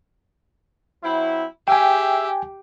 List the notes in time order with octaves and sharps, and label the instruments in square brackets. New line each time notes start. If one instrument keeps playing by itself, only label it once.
[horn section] F#3 C4 E4
[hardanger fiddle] G4 [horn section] G#4 E5 [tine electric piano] G5 G#5